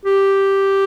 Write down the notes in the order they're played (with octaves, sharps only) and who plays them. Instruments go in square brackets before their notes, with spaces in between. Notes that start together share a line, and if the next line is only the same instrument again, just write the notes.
[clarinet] G4